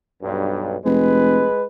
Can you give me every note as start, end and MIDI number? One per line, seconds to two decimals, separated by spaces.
0.22 0.76 35
0.22 0.76 43
0.85 1.47 29
0.85 1.64 56
0.85 1.64 71